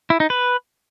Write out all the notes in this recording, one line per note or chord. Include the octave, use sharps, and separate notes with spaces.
E4
D#4
B4